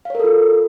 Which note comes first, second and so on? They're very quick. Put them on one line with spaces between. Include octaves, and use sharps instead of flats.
F5 C#5 A#4 A4 F4